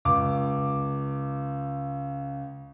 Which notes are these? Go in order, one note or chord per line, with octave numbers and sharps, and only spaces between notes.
C#2 D6